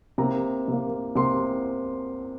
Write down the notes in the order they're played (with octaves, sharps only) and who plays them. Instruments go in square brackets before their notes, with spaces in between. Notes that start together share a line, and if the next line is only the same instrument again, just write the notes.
[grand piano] C3 A#3 A#5
C3 A#3
C3 A#3 C6